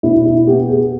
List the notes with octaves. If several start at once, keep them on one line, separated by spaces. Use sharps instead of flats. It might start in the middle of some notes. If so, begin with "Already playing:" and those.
B2 E4
E4
B3 G4
G#4